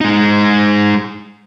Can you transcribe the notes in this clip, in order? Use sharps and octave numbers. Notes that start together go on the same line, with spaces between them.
G#3 D#4